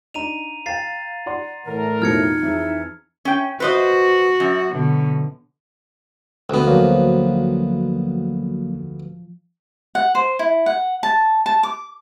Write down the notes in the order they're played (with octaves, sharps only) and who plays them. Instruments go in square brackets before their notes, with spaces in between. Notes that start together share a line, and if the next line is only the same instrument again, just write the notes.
[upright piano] D4 D#4 [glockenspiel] A#5 D#7 F7
[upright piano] F5 G5 [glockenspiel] A#5 A6 C7
[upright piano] D5 F#5 C6
[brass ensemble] A2 A#4 [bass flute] E3
[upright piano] F2 B2 F3 [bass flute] D#4 [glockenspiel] F6 G#6 C#7
[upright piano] F2 G#4 [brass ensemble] E3 E5
[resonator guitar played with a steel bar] C#4 G5
[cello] F#4 [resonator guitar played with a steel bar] B4 C5 D#5
[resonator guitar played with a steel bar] F#2
[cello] B2 D3
[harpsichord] D2 B3
[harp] F3 [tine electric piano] F#3 A#3
[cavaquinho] F#5
C5
E4
F#5
A5
A5
D6